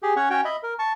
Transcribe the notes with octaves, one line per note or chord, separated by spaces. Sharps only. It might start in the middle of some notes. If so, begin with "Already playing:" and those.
G4 G#4
C#4 C#5 F#5 C#6
C#4 F#4 C#5 G5
D#5 E5 B5
A#4
A5 C#6